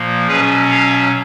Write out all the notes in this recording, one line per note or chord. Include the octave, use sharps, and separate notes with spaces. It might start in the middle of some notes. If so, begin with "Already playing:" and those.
Already playing: A#2 F3 A#3
B2 F#3 C#4 G#4 B4
C#5 F5